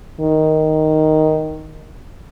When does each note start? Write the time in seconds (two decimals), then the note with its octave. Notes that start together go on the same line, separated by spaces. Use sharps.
0.20 D#3